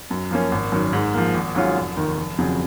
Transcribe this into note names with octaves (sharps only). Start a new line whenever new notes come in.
F#2
F3 A#3 C#4
G#1
F#2 D#3 F#3
G#2
F3 A#3
G#1
G#2 F#3 C#4 F4
F1
D#2 D#3
F1
F2 C#3 F#3